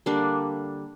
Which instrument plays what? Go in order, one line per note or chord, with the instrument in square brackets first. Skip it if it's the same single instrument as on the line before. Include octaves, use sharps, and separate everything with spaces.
[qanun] D3 G3 A#3 D4